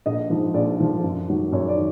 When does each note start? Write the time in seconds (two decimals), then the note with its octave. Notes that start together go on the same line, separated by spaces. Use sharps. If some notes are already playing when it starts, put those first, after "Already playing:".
0.06 A#1 D#5
0.30 G#2 F3
0.54 A#1 D5
0.79 G#2 F3
1.04 F#2
1.28 D#3 F#3
1.52 F#2 C#5
1.69 D5
1.76 D#3